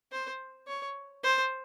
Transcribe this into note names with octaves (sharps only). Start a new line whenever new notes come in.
C5
C#5
C5